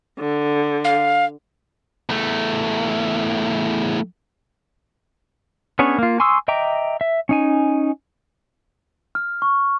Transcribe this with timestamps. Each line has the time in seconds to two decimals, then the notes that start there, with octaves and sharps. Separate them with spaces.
0.20 D3
0.84 F5
2.10 E2 A3
5.79 B3 C#4 D4 G#4 C#5
5.99 A#3 F4
6.20 G#5 C6 C#6 D#6 E6
6.48 D#5 E5 G5 A#5 D6
7.01 E5
7.29 C#4 D#4 G#5
9.15 F6
9.42 C#6